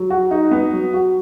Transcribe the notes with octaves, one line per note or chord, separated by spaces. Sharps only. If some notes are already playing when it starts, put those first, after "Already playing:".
Already playing: F#3
F#4
D#4
B3
F#3
F#4